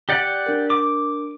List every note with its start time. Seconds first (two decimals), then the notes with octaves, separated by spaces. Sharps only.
0.09 G4 D5 F#5
0.46 D4 A#4
0.70 D6